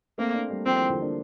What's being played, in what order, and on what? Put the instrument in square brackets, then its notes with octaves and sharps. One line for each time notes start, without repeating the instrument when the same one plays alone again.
[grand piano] A3 C4 [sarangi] A#3
[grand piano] A#3 D4
G3 A#3
[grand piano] F3 A3 [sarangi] C4
[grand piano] E3
D3 F3
A#3 D4